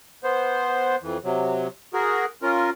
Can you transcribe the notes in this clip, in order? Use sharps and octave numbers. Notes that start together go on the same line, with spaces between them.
B3 C5
F2 E3
C3 F#3
F#4 G#4 A#4
C#4 F4 A#4